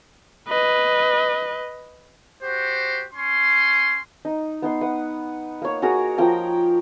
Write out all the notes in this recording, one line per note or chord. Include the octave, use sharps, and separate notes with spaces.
B4 D#5
F#4 G4 C5
C#4 C6
D#4
B3 D#4 C6
B4 F#5
A#3 C#5
F#4 G#4 A#4
F3 A#4 G5 A#5